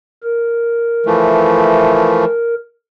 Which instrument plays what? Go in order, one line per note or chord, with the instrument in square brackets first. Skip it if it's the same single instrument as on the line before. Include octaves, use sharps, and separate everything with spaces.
[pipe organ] A#4
[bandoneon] E3 F3 A3